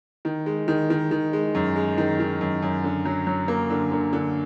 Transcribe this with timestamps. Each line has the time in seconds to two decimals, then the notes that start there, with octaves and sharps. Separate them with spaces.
0.25 D#3
0.46 G#3
0.68 D#3
0.90 D#3
1.11 D#3
1.33 G#3
1.55 F#2
1.76 G#3
1.98 D#3
2.20 D#3
2.41 F#2
2.62 F#2
2.84 D3
3.05 F#3
3.27 F#3
3.48 A#3
3.70 D3
3.91 D3
4.13 D3